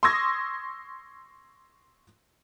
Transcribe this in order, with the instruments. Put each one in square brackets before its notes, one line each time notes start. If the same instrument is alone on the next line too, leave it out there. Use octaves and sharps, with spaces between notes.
[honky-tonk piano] C6 C#6 D#6 E6 G#6 A#6